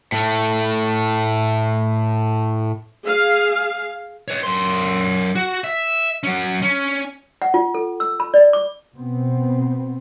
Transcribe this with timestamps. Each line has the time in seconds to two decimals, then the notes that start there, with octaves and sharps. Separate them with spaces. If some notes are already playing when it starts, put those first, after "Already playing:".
0.12 A2 A3
3.05 G#4 F5
4.28 B4 C#5
4.43 F#2 C6
5.35 F#4
5.64 E5
6.23 F#3 C#4
6.62 C#4
7.42 F#5
7.54 F4
7.74 A4
8.00 E6
8.20 B5
8.34 D5
8.53 D6
8.95 B2 B3 C4